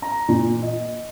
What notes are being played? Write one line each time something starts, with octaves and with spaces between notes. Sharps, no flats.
A#5
A#2
D#5